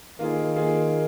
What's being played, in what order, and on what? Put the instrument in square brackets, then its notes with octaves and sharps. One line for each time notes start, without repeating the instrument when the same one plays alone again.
[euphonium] D#3 [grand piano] A#3 F4 G#4
[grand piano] A#3 F4 G#4